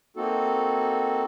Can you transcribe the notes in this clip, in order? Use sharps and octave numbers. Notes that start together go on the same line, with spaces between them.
A#3 C4 D#4 F#4 A4